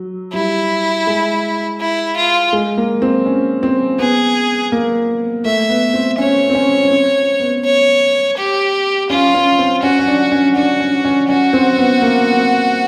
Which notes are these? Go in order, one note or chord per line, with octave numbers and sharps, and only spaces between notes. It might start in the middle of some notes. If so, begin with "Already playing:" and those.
Already playing: F#3
G3 E4
G#3
E4
F4
G#3
A#3
C4
C#4
C4
B3 G#4
A#3
A3 E5
B3
C4
C#4 C#5
C4
C#4
C#4
C4
B3
C#5
G4
C#4 F4
C#4
C4
C#4 F#4
C#4
D4
C#4
D4 F#4
C#4
C#4
C#4 F#4
C4
B3
A#3
C4